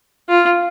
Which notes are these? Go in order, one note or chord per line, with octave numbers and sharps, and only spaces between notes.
F4